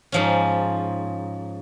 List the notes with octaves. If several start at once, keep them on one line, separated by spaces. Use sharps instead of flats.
G#2 F3 C#4